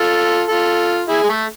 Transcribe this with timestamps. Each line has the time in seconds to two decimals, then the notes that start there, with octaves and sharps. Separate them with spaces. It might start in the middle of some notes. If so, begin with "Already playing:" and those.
Already playing: F4 A4
0.49 F4 A4
1.08 E4 G#4
1.23 G#3
1.29 A3